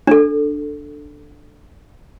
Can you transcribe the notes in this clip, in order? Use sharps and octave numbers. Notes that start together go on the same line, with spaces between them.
D4 A4